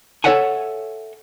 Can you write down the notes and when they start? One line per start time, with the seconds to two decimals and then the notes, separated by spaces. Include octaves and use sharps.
0.24 A4 B4 C#5 E5 F#5 G#5